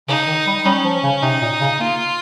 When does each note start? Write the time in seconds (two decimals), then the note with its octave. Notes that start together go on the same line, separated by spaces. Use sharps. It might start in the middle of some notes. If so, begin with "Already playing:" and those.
0.08 C#3 D#4
0.27 D#3
0.47 G3
0.65 G3 C#4
0.85 F3
1.04 C#3
1.23 C3 D#4
1.42 A#2
1.61 C#3
1.80 A#3 F4